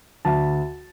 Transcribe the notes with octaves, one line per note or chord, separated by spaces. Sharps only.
D2 A5